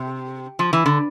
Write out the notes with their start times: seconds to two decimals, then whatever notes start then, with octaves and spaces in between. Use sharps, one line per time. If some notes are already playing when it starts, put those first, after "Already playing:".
Already playing: C3
0.59 F3
0.73 E3
0.86 D3